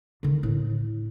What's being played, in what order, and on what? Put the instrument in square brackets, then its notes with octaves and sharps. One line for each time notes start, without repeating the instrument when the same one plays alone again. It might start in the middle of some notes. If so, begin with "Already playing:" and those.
[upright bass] D3 D#3
A2